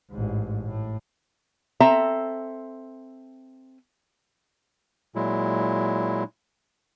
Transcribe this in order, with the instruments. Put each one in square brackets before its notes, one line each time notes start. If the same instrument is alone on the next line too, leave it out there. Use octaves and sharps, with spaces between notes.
[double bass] A1 G#2
A2
[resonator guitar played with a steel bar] C4 A4 E5 A#5
[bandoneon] A#2 F#3 G#3 E4